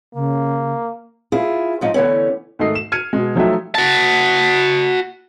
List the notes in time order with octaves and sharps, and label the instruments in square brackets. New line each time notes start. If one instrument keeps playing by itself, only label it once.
[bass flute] C#3 [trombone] A#3
[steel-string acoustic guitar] E4 F4 G#4
G#2 F3 D#4
D3 E3 A3 B3 C#4
[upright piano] G#2 D#3 A3 D#5 C7
E7
F6 G#6 C#7 D#7
B2 G#3
F3 F#3 A3 D#4 G4 E5
[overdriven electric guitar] F#4 A5